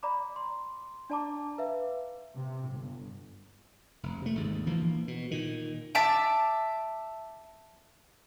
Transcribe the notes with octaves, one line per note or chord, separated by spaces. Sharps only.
D5 A#5 B5 D6
C6
D4 D5 A5 A#5 D6
B4 E5 F5
C3
G1
F1
C3 A3
G#1 D#2 G#2
A#1 E3 F3 A#3
B2
A#2 D#3
E5 A5 D6